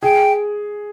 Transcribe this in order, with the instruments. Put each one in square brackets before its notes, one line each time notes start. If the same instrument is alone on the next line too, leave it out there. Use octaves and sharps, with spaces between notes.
[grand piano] G#4 [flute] G5